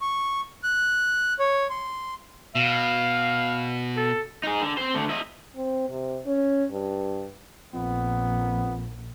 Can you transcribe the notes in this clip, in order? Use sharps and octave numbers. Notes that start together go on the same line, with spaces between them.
C#6
F#6
C#5
C6
B2 F5
A4
D#4 G#4
D3
C4 C5
D3 A3
E4 D#5
C4
C3
C#4
G2
A#1 F2 B3